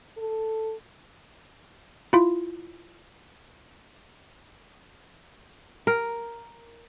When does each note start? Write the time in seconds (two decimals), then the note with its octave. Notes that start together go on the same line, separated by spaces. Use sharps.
0.17 A4
2.13 E4 F4
5.87 A#4